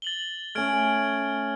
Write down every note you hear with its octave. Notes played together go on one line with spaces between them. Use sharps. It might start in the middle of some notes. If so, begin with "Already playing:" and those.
A6 F#7 G7
A3 C#4 F6 G#6 D7